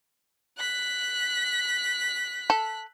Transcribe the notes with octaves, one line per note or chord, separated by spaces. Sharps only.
F#6 B6
A4